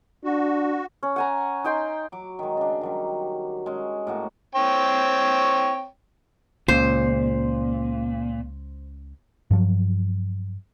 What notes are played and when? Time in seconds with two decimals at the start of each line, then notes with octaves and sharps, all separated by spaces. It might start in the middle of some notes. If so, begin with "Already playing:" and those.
0.24 D4 F#4
1.03 C#4
1.16 F#5 G#5 A#5
1.64 D#4 G5 C6
2.12 F#3 D6
2.39 D#3 G#3
2.57 C#3 D4
2.81 D#3 F#3 G3
3.66 G#3 C#4
4.07 A2 A#3 F#4
4.55 C4 C#5 G5
6.68 C#2 A#2 C#3 C5
9.51 G2 F3 F#3